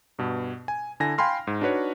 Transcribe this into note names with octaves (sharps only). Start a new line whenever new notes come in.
G2 B2
G#5
D3 E4 G#5 A#6
F5 G5 G#5 B5 C6 F6
G#2
D4 D#4 F#4 B4 C#5